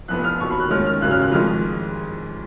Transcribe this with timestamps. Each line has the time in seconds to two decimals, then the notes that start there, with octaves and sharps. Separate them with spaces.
0.08 F1 F2 F3 B3 F#6
0.24 F6
0.40 D#2 D#3 F#3 C#6
0.51 B5
0.60 F#6
0.70 D#2 D#3 G#3 C#4 F6
0.87 F6
1.01 G#1 F#2 C#3 F#3 F#6
1.11 F6
1.22 F#6
1.32 F2 D#3 G#3 F6